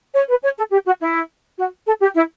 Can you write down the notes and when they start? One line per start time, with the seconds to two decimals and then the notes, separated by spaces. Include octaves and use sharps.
0.14 C#5
0.29 B4
0.43 C#5
0.57 A4
0.71 G4
0.86 F#4
1.00 E4
1.58 F#4
1.86 A4
2.00 G4
2.15 E4